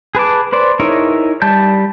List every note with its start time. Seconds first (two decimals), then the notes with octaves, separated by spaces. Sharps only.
0.15 G#4 B4 A5 D6
0.52 B4 C5 D5
0.80 D#4 E4 G#4 A#4 C#5
1.42 G3 A5 G6